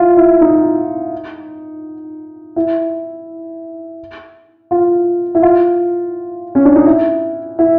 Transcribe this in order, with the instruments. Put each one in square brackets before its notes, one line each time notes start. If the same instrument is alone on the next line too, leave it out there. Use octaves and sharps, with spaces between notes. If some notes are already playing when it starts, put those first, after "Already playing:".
Already playing: [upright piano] E4 F4
E4
D#4
E4
F4
E4
F4
C#4
D4
D#4
E4
E4